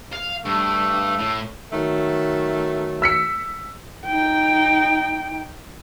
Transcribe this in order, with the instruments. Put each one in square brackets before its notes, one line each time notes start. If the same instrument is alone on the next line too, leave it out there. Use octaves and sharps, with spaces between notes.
[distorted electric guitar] F5
[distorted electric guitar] G2 [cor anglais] A3
[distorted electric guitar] A2
[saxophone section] D#3 F#3 A3
[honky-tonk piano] E6 B6 C#7
[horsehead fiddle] D#4 G5